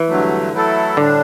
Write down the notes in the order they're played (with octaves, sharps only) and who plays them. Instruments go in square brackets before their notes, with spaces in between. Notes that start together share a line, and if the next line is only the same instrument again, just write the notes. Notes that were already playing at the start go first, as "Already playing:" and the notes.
Already playing: [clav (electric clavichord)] E3
[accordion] G2 D3 F#3 A3
F#3 A3 E4 A4
[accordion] A2 G3 D4 [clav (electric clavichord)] D3